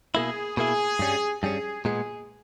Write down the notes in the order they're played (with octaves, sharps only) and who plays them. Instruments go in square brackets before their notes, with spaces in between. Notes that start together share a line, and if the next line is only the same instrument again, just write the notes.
[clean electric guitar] B2 A#3 E4 [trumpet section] G#4
[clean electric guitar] B2 A#3 E4 [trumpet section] G#4
[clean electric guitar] G2 G3 C#4
[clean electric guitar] G2 G3 C#4 [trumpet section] G#4
[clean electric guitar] A#2 G#3 B3 [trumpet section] G#4